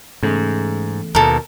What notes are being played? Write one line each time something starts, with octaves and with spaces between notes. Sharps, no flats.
E2 G#2 C#3 A3
D#2 B2 A4 A#4